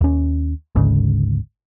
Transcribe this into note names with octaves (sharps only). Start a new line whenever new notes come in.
D#2 C#4
G#1 D2 G#2 C#3